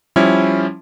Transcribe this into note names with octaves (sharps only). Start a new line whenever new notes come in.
F3 G3 C#4 E4